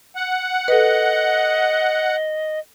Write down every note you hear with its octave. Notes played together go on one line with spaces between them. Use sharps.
F#5
A4 B4 D#5